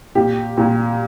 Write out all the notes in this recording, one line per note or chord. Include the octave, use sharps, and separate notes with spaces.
A#2 G4
A#2